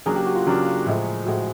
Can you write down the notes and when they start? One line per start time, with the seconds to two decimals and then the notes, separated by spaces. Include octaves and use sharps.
0.06 C#3 F#3 A#3 D4 G#4
0.16 G4
0.26 F#4
0.36 F4
0.47 C#3 F#3 A#3 D4
0.86 A2 F3 G#3
1.26 A2 F3 G#3 F#4